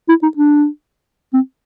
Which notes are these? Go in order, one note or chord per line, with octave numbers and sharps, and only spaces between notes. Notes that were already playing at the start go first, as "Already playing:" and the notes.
E4
D#4
D4
C4